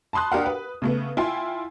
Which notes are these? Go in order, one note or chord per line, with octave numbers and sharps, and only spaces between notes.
A5 B5 C6 D#6 F#6
D4 G4 A#4 F5 F#5
B4
C#3 A3 B3
E4 F4 G5 G#5 C6